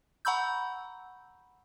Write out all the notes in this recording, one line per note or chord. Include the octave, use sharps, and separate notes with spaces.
F#5 A#5 B5 C#6 E6 G6